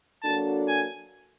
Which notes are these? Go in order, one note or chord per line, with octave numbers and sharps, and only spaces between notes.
F#3 A#3 D4 F#4 A4 A5
G#5